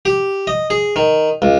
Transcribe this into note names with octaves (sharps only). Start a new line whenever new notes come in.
G4
D#5
G#4
D#3
C#2